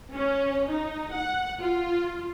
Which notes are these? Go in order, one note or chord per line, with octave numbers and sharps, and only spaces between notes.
C#4
D#4
F#5
F4